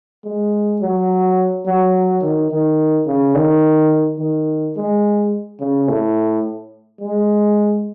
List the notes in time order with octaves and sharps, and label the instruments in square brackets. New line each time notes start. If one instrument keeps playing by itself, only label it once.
[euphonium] G#3
F#3
F#3
D#3
D#3
C#3
D#3
D#3
G#3
C#3
A2
G#3